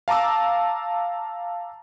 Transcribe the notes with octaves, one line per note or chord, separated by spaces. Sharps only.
F5 A5 A#5 D6 E6